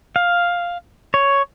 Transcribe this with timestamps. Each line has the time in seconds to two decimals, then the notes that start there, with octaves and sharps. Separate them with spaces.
0.16 F5
1.14 C#5